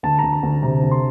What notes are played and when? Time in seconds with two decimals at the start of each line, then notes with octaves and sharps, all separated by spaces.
0.03 D2 A5
0.19 D2 A#5
0.33 A#5
0.43 D2
0.63 C3 A#5
0.83 D2
0.91 C6